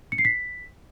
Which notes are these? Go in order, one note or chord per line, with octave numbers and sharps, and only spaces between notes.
C#7
C7
B6